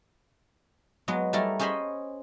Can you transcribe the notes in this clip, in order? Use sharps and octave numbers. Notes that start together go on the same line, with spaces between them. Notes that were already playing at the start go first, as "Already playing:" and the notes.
F#3 G#3 B3
G3 A3 E4 A4 A#4
C#4 G#4 C5 D#5 G#5 B5